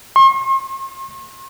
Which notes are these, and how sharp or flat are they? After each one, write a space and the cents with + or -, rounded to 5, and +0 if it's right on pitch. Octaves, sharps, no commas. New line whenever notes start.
C6 +45